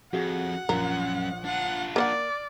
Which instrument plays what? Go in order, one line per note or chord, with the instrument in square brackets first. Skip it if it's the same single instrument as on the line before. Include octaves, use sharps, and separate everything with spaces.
[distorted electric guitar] F2 [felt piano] F#4 G#4 [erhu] F#5
[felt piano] A#1 [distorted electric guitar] F#2 [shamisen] A#4
[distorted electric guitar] D4 F4 [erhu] F#5
[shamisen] A#3 C5 F#5 [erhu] D5 [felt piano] F6